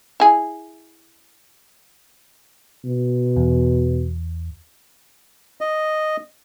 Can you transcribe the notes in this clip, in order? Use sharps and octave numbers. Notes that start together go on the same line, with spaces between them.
E4 G#4
B2
E2
D#5